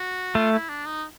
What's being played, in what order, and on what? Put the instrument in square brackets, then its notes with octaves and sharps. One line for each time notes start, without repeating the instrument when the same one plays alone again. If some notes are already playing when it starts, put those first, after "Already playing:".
Already playing: [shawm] F#4
[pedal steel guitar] A3 [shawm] F4
[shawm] E4
D4
D#4